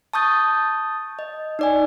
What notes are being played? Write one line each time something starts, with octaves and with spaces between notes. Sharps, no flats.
A5 C#6 D#6 G6 A6
D#5
D#4 D5 G#5